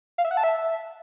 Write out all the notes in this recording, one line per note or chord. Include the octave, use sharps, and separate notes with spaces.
F5
E5
F#5
A5
E5